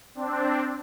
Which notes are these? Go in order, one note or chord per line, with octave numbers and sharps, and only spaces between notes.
C4 D4